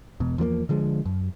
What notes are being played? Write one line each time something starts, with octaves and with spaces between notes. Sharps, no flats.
E1 B2
E2 F3 A3 A#3
D3 F3 G#3
F#2